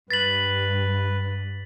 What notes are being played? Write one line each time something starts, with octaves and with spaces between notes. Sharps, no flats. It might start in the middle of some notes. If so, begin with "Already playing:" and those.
G2 B4 A6 B6 F#7